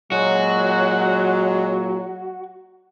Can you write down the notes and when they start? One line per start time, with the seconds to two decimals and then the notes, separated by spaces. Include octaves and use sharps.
0.12 A#2 F#3 G#3 F#4